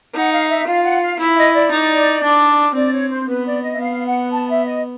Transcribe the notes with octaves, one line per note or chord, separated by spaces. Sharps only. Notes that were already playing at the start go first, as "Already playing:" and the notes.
D#4 F#5
F5
E5
F4 F5
F#5
F5
E4 E5
D#5
D5
D#4
D4
C4 D5
C#5
C5
B3 B4
D5
D#5
E5
B3 F5
F#5
A5
E5
D#5